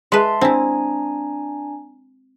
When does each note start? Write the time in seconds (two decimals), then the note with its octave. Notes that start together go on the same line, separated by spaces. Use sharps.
0.12 G#3 B4 E5 A5 C6
0.41 C4 D4 E4 G#5 A#5